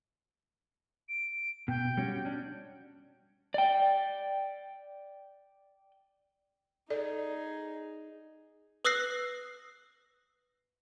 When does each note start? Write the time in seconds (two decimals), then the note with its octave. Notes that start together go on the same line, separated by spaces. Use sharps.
1.09 D7
1.68 B2 G5
1.97 G3 C#4 F#4
2.25 C#4 D4
3.54 D5 G5
6.90 D#4 G#4 A4 D5
8.85 B4 D#6 E6 F#6 A#6 C7